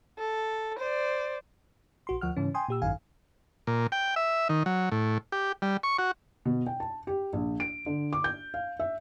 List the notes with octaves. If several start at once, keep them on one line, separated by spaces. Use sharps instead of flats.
A4
C5 D5
A#1 F#4 C6
D2 F3 F#5 F6
G#2 C#3 E3 C#4
G5 G#5 C6 D#6
A#2 G4 E6
G#1 F#2 D#3 F5 G#5
A#2
G5
E5
D#3
F#3
A2
G4
G3
C#6
F#4
B2
G5
A5
G4
A#1
D7
D3
D6
G6
F5
E5